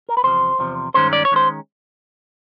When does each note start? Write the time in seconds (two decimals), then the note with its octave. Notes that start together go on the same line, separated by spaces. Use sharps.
0.09 A#4
0.17 B4
0.23 E2 C3 F3 C5
0.59 E2 C3 F3
0.94 G2 D#3 G#3 C#4 C5
1.13 D5
1.25 C#5
1.31 D#3 G#3 C#4 C5